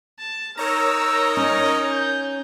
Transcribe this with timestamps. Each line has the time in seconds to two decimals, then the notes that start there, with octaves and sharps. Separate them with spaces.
0.18 A5
0.57 D#4 A#4 C#5 A#5 E6
1.37 C#4 D#5
1.91 G6